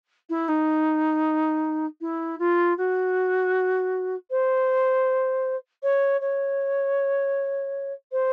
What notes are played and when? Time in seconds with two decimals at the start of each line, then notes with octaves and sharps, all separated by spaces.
0.30 E4
0.48 D#4
2.01 E4
2.39 F4
2.78 F#4
4.31 C5
5.83 C#5
6.21 C#5
8.12 C5